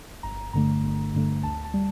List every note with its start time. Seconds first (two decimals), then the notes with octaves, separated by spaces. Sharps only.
0.23 G1 A#5
0.53 G2 D3 A3 A#5
0.83 G1
1.14 G2 D3 A3
1.43 D2 A5
1.65 A5
1.74 G3